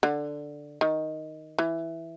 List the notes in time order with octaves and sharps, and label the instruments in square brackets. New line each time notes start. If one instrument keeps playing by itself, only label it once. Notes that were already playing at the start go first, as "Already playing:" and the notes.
[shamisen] D3
D#3
E3